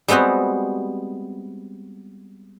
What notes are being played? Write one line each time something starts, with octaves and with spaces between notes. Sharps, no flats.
G3 G#3 B3 C4 F#4